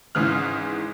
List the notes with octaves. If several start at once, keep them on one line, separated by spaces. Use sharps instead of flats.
G#1 G#2 C#3 E3 G#4 F6